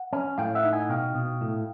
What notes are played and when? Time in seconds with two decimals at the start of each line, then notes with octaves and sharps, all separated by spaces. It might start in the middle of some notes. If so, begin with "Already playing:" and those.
Already playing: F#5
0.13 C#4
0.38 A2 F5 G5
0.55 E5 F#5
0.64 D#4
0.72 F#5 G#5
0.89 B2 F5 G5
1.15 B2
1.41 A2